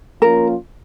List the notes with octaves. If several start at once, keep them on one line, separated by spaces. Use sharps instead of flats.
F3 A#3 C#4 F4 A#4